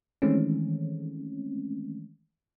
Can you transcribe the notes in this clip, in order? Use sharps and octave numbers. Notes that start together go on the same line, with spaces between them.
D#3 E3 G#3 A3 C4 C#4